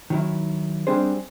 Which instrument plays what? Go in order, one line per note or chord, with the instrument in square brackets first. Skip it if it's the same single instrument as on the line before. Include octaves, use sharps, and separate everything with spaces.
[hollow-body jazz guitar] D#3 F#3 E4
G3 C4 D4 G#4 C5